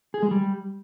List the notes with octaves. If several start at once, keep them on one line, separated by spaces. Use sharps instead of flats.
G#4
G#3
G3